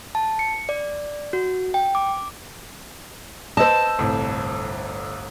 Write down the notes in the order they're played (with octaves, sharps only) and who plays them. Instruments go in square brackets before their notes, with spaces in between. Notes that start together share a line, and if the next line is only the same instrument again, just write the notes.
[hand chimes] A5
C#7
D5
F#4
G5
D6
[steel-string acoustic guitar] C5 A5 [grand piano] D#5 E6
[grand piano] G1 C2 A2